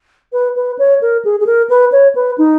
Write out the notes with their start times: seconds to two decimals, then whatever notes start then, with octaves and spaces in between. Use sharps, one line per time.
0.32 B4
0.56 B4
0.79 C#5
1.01 A#4
1.25 G#4
1.40 G#4
1.46 A#4
1.69 B4
1.92 C#5
2.15 B4
2.38 D#4